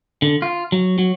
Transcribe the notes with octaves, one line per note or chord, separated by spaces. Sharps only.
D3
F4
F#3
F#3